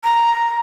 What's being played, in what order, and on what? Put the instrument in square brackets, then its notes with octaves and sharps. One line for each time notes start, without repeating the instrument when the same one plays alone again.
[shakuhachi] A#5